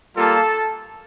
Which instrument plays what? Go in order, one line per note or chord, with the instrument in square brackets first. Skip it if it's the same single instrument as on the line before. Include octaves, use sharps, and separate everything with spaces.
[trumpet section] G3 A#3 F4 A4 A5